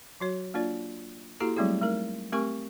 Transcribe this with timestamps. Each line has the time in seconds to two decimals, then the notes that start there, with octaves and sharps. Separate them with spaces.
0.20 F#3 F#4 C#5
0.54 A#3 D4 F4 D5
1.40 A#3 E4 F#4 G4 A4 A#5
1.57 F#3 G3 A3 C4 E4 G#4
1.82 A3 D#4 A#4
2.32 A3 C4 G4 A#4 G#5 C#6